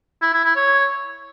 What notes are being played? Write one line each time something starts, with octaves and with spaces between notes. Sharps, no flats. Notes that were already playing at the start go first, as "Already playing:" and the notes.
E4
E4
E4
C#5